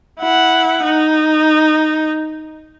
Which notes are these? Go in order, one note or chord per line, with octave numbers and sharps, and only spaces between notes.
E4 F#5
D#4